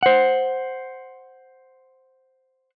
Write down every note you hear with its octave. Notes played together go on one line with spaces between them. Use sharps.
C5 F#5